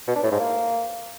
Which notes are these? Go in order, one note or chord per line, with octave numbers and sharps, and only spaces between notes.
B2
D4
A2
G#2
A#3